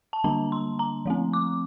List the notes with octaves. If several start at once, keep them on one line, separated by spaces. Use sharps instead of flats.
A5
D3 G3 A#3 D4 A#5
C6
A#5
F3 A3 C4
D6